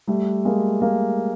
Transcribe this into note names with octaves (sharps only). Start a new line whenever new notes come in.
G3 A3
G#3 A#3
A#3